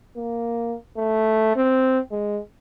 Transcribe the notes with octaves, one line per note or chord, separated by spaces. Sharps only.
A#3
A3
C4
G#3